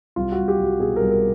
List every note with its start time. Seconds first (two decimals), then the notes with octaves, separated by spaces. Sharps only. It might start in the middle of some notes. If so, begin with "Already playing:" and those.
0.16 C2 F4
0.32 F#4
0.38 C2
0.48 G4
0.58 C2
0.64 F#4
0.79 B2 G#4
0.96 C2 A#4
1.11 A#4